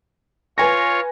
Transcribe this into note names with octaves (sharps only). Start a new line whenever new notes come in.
F4 B4 C#5 G#5 C#6 A#6